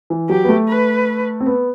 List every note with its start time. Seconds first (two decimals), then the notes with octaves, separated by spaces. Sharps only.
0.10 E3
0.29 F#3 G4
0.44 B3
0.49 A3
0.68 B4
1.40 C4
1.46 B3